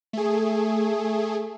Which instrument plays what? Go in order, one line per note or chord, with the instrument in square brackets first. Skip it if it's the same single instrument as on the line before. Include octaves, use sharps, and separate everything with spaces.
[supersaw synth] A3 G#4